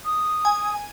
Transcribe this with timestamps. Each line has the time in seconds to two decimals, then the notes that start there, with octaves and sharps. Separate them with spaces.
0.05 D#6
0.45 G#5